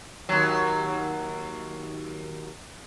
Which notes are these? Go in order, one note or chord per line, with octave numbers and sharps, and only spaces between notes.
D#2 F#3